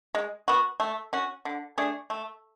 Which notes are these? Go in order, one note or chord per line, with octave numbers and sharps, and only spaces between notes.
G#3
B3 F#4
A3
C#4 F#4
D3
A3 D4 G#4
A3